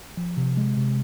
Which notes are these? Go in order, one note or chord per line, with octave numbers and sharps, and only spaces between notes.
F3
C3
G#3
C3